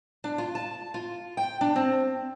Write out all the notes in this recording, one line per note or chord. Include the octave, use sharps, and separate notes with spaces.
D4
F4
A5
F4
G5
D4
C4